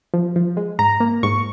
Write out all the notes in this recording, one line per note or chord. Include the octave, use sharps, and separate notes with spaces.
F3
F3
G#3
G#2 A#5
A#3
G#2 C#6